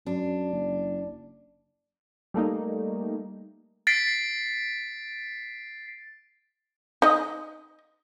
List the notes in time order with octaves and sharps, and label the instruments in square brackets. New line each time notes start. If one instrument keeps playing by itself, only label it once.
[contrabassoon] F#2 [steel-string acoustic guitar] D4
[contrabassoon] F#1
[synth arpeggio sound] G3 A3 A#3 D#4
[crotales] A6 B6 C7 D7
[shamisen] D#4 D#5